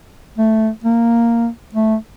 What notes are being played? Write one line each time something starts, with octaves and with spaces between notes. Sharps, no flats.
A3
A#3
A3